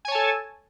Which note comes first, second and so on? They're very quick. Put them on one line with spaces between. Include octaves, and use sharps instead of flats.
G#5 C#5 A5 A4